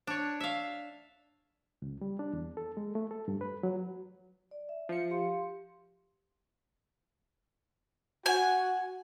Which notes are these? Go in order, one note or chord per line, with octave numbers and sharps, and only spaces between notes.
D4 C#5
E5 F5
C#2
G3
D4
E2
A4
G#3
A3
A4
G2
B4
F#3
D5
E5
F3 C#7
G4 F5 C6
F#4 F#5 G#5